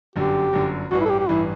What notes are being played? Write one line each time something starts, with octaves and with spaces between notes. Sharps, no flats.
G1 F#2 D3 G4
G1 F#2 D3
A1 G2 E3 F#4
E4
A4
G4
G4
A1 G2 E3 E4